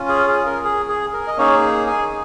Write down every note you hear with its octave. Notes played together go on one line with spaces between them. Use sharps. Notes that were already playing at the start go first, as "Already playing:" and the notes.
Already playing: C#4 F4
G#4
G#4
A#4
G#4
G#4
A#4
D#5
A#3 C#4 D#4 G#4 C#5
G#4 G#5